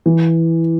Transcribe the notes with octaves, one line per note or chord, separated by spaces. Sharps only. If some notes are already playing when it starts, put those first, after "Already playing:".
E3